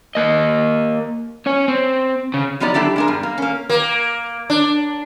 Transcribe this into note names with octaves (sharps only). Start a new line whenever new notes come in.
A#3 D#5
C#4 C#5
C4
C#3
F3 F#3 B3 D#4 G4 D5
F#3 D4 E4 G4 A4
G#3 D4 A#4
E2 G2
A#3
A#3 C#4
A#3
D4